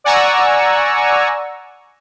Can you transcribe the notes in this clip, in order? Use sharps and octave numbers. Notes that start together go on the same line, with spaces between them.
D5 F#5 G#5 A#5 C#6 E6